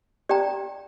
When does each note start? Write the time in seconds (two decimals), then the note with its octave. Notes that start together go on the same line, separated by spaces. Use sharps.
0.29 G4 D5 G5 A#5